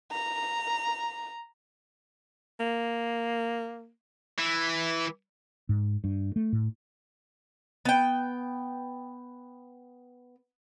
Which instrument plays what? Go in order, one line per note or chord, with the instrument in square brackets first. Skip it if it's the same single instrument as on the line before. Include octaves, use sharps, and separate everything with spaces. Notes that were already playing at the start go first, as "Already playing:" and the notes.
[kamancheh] A#5
[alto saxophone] A#3
[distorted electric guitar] E3
[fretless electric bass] G#2
G2
A3
A2
[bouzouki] B3 G5